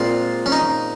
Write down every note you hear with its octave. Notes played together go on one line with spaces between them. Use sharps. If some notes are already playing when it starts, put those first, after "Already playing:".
Already playing: A#2 G#3 C4 F4
C#4
D#4